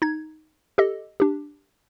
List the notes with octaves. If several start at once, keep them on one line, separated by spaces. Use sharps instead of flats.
D#4 G#6
G4 A4 D#5
D4 G4